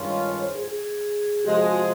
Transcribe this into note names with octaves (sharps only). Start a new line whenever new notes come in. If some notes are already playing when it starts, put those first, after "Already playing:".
Already playing: G2 D#3 G#3 C#4 F4
D#5
C#5
C5
G#4
G#4
C3 F3 G#3 G4
F#4
F#4